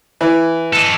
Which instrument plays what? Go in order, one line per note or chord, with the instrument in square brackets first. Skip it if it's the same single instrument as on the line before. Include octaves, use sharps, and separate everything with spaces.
[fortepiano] E3
[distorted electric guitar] A4 D#5